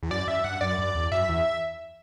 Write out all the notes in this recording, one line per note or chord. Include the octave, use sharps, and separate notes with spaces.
E2
F#2 D5
F#2 E5
G2 F#5
F#2 D5
F#2
E2
F#2 E5
E2